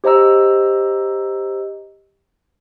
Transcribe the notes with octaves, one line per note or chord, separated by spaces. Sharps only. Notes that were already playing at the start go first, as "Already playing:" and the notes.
G4 C5 D#5 A#5 E6